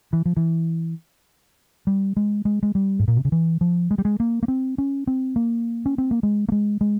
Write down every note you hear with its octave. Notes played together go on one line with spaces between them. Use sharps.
E3
F3
E3
G3
G#3
G#3
G#3
G3
G#2
A#2
C3
C#3
E3
F3
G#3
G3
G#3
A#3
A#3
C4
C#4
C4
A#3
C#4
C4
A#3
G#3
A#3
G#3
G#3